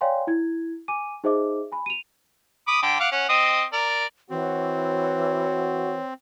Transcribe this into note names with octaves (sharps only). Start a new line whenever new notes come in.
C#5 D5 F5 G5 G#5 C6
E4 G#6
G#5 D6 D#7
D#4 G#4 C5 D#5 E5 D6
G#5 B5
D#7 F7
B5 D6 D#6
D3 G5 D6
F5 F#5 D6
C#4 F#5
C4 D#5 D#6
A#4 D5
E3 C4 F#4 C#5